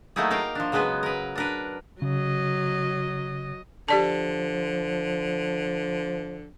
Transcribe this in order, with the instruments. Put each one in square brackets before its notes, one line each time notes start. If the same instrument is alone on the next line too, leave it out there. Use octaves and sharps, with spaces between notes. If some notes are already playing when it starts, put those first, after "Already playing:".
[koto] F#3 A3 A#3 D#4 E4 G#4
A#4 D#5 F5 G5
F3 D4
C#3 F#3 G#3 B3 B4
A#4 B4
D4 A#4 B4
[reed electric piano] C#3 [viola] F#3 D#5
[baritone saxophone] D3 [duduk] F3 [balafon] G4 D5 A5